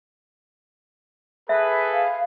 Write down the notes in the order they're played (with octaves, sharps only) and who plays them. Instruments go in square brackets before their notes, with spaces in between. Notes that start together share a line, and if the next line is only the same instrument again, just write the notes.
[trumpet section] G#4 A4 B4 [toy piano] E5
[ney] F5